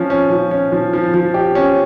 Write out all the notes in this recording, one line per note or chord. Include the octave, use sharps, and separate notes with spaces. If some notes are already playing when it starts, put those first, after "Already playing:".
Already playing: F3 C#4
C#4
F3
C#4
F3
F3
F3
G4
C#4